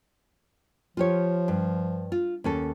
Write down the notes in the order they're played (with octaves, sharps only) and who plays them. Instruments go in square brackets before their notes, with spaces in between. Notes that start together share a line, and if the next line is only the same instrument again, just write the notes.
[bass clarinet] F3 [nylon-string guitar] F4 G4 C#5
[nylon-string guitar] G2
F4
D#2 C#4 A4